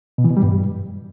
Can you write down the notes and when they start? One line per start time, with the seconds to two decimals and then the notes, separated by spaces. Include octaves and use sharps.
0.18 B2
0.24 E3
0.31 B2
0.37 G3
0.43 G2